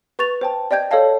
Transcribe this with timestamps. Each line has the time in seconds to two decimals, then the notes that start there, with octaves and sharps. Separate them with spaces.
0.19 B4 C#6 A6 F7
0.41 C5 G5 A5
0.71 D5 D#5 G5 G6 G#6
0.91 A4 C#5 D#5 F5 A5